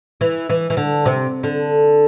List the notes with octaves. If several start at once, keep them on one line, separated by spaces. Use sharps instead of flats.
E3
E3
E3
D3
C3
D3